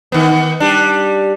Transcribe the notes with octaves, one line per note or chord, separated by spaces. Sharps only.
D#3 B3
G3 D4